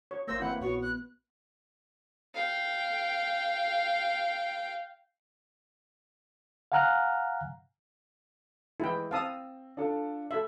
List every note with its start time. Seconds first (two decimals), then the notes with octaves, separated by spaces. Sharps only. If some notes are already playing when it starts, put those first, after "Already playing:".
0.11 C#5
0.27 G1 A#3 C5 E6 G6 G#6 A#6
0.40 E3 A#3 C4 E4 F#5
0.61 A#1 A#2 B3 F#4 C#5
0.82 F#6
2.34 F5 G5
6.72 F5 F#5 G#5 A#5 F6 F#6
8.80 E3 G#3 E4 G5
9.11 C4 F5 A5 D#6 E6
9.77 D4 F4 A4
10.31 A4 E5